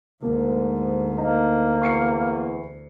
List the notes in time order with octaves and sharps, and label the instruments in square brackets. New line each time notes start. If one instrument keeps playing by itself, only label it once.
[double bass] D2 [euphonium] G#2 [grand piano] A#3
[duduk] A#3 [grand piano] D#4 A#5
[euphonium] E2 [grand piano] C#6 C7 C#7